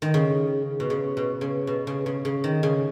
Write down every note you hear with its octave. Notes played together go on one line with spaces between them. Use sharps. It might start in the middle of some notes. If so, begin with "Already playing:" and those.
D#3
C#3
B2
C#3
B2
C#3
B2
C#3
C#3
C#3
D#3
C#3